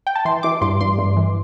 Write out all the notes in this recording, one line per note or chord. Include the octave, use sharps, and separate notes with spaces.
G5
A5
E3 C6
E3 D6
G2 C6
G2 C6
G2
E3